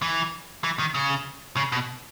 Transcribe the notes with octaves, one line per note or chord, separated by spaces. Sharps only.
E3
E3
D#3
C#3
C#3
B2